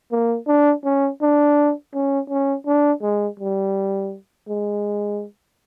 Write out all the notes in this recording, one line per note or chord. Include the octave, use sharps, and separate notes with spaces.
A#3
D4
C#4
D4
C#4
C#4
D4
G#3
G3
G#3